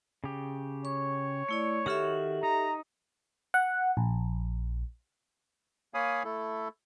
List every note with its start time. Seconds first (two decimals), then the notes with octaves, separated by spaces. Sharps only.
0.24 C#3 G4
0.85 C#5 C#6
1.49 A3 E4 D5
1.86 D#3 F#4 G4 A4 E5 F6
2.43 D#4 A#5
3.54 F#5
3.97 A#1
5.94 A#3 C#5 F5 G#5 B5 D#6
6.24 A3 E4 A4